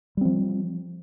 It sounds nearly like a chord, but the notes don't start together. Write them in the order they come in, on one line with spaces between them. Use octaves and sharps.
G3 C4 F3